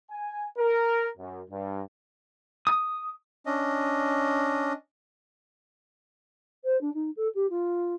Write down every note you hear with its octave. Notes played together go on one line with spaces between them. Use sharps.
G#5
A#4
F#2
G2
D#6
C#4 D4 D#5
C5
D4
D#4
A4
G4
F4